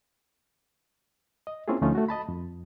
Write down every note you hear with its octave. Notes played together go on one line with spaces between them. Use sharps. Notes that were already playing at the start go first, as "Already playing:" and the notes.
D#5
A#3 C4 C#4 E4 F4 G#4
D2 F3 A3 C#4 D#4 F4
A3 F#4
D#5 A5 B5
F2